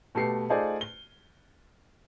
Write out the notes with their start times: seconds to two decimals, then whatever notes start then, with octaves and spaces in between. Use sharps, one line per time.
0.15 B2 A3 G4 C7 C#7
0.49 A3 D#4 F4 G#4 C5 D5
0.81 G7